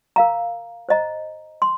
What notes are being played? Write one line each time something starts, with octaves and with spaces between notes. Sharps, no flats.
A#4 F5 A#5
C5 D#5 A#5
C6